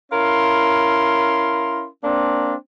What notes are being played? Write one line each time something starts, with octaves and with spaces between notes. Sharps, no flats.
C#4 E4 A#4 F5 C6
A#3 C4 D4